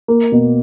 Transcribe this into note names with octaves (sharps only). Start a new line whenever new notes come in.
A#3
B2